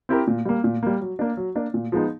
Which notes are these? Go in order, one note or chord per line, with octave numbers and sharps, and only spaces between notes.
C4 E4 G4 A#4
A#2
G3 A#3
A#2
G3 A#3
F#3
A#3 D4
F#3
A#3 D4
A#2
F3 G#3 B3 D#4